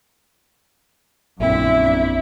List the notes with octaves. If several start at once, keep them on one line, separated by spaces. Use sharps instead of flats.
A#1 F#2 A#2 D3 C4 E4 E5